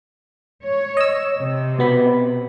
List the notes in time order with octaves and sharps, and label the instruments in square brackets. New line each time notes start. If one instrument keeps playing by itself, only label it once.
[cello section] C#5
[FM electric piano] D#5 E6
[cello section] C3
[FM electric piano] B2 B3 B5